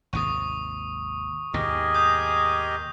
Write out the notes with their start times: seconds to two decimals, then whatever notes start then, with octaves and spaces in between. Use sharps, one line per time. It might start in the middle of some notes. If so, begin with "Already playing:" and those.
0.13 G#1 D#2 C3 C#6 D#6
1.54 D#2 G#2 B2 G4 G#4 A#4 D#5
1.95 D#6 G6